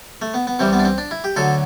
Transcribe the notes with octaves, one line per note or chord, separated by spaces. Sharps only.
A3
B3
B3
C2 C3 E3 G3 C4
B3
D4
C4
D4
E4
G4
D2 D3 F#3 A4